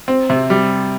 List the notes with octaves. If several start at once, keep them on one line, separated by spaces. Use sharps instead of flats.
C4
C3
G3